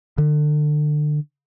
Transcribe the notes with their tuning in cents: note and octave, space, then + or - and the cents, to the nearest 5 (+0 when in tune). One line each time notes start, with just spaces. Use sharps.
D3 +30